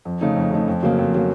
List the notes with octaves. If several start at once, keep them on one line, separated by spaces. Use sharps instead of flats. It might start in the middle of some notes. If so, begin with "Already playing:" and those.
F2
C#3 A3 D#4
F2
C#3 A3 D#4
F2
C#3 F#3 A#3
F2
C#3 F#3 A#3